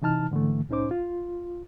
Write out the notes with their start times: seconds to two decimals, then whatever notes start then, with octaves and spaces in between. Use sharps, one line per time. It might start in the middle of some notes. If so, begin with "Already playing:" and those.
0.02 C3 E3 D#4 A5 F6
0.31 G#2 D3 E3 A3
0.69 C2 A2 C#4 D#4 C5 D6
0.91 F4